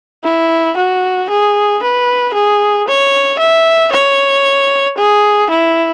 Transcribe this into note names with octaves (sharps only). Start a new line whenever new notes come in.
E4
F#4
G#4
B4
G#4
C#5
E5
C#5
G#4
E4